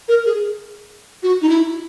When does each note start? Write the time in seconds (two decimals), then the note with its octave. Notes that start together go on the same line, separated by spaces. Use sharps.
0.08 A#4
0.26 G#4
1.23 F#4
1.42 D#4
1.49 E4